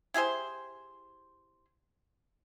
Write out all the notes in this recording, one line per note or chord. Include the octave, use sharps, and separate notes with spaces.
E4 G4 G#4 C5